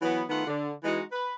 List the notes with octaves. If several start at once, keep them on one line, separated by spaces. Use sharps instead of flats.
E3 F#3 B3
D#3 A3 B3 F4 F#5
D3
E3 G#3 B3 D#4 F#4
B4